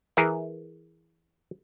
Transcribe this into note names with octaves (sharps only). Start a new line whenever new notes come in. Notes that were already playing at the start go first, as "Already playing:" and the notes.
E3 G#4 A#4 E5